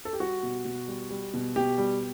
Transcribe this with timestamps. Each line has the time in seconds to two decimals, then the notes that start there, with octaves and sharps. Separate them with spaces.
0.05 A4
0.13 G4
0.20 G3 F#4
0.43 B2
0.65 B2
0.88 G3
1.10 G3
1.34 B2
1.56 B2 G4
1.78 G3